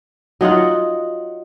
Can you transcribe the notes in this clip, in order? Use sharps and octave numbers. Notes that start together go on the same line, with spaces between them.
F#3 D#4 F4 F#5